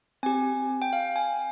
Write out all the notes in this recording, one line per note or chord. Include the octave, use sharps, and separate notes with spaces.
C4 G4 G#5
G5
F5
G#5